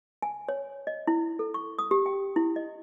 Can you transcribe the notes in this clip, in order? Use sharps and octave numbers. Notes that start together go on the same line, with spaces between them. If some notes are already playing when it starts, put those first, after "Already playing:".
G#5
C#5
D#5
E4
A4
C#6
D#6
G4
G5
E4
D#5